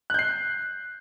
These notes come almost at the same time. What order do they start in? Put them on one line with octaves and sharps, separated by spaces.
F#6 G6 C7